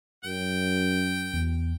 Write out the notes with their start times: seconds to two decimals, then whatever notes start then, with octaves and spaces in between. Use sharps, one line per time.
0.24 F#2 G5
1.34 E2